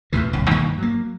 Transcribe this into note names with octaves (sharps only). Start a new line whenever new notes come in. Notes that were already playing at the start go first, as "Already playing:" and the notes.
F2 A2 C#3 E3
D#1 C2
G2 D#3 E3 A#3
F#3 A#3